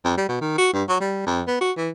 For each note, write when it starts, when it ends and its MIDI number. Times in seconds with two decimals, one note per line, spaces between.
0.04 0.17 41
0.17 0.27 55
0.28 0.40 47
0.41 0.53 51
0.58 0.68 66
0.73 0.83 43
0.89 0.98 54
1.01 1.23 55
1.26 1.42 41
1.47 1.57 59
1.61 1.72 66
1.77 1.90 52